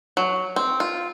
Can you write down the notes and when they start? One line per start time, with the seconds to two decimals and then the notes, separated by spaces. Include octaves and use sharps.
0.17 F#3
0.56 C4
0.80 F4